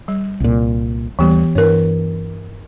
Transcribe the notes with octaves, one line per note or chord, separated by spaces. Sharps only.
G3
C2 A#2
D#2 E3 G3 B3 G4
G2 E3 A#4 C#5